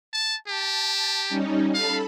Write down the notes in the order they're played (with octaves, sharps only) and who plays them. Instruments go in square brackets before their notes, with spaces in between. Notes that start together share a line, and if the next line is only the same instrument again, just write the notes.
[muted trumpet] A5
[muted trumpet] G4 [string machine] A5
[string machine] G3 C#4 D#4
[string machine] A4 A5 B5 [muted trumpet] F5